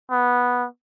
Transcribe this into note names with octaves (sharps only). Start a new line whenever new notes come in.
B3